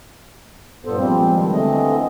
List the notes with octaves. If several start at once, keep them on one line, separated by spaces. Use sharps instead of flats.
G2 A#2 B3 A4 C5
F3 G3 G#3 A#3 C4
B2 D#3 G3 G#3
D3 E3 A3 C4 D#5